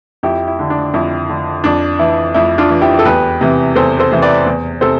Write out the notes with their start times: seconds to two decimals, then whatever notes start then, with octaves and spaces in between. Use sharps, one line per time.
0.23 F2 E4 G4
0.47 E4
0.59 D3
0.70 D4
0.94 F2 E4
1.29 D3
1.64 F2 D4
1.99 E3 E4
2.34 F2 E4
2.58 D4 F4
2.70 E3
2.81 E4 G4
2.99 A4
3.05 E2 G4 B4
3.41 C3 E3
3.75 E2 A4 C5
3.99 A4 C5
4.12 C3 E3
4.22 B4 D5
4.46 E2
4.81 C3 A4 C5